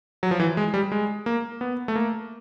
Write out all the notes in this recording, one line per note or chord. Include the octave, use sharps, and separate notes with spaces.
F#3
F3
E3
G#3
G3
G#3
A#3
B3
A3
A#3